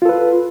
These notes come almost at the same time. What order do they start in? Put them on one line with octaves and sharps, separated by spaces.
F4 A4 B4